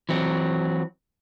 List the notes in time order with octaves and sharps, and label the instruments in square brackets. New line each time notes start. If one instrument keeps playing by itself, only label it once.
[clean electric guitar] E3 F#3 C4